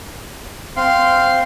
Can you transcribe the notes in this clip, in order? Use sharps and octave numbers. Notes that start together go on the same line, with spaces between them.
C4 F5 C6